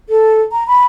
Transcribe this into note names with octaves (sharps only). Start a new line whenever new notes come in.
A4
A#5
B5